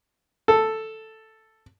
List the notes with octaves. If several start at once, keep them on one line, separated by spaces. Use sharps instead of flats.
A4